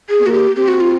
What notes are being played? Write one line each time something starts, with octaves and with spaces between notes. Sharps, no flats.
G#4
B3
A#3 F#4
G4
C4 G4
F#4
F4